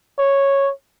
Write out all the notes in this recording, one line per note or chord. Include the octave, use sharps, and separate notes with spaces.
C#5